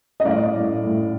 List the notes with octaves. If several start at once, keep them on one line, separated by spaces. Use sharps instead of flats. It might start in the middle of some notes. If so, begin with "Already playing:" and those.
D#5
A2 D5 F5
A2
A2